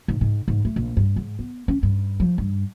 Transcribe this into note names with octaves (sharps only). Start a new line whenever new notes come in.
G#2
G#2
G#2
A3
A#1
G2
G#2
B3
C#4
G2
F3
G2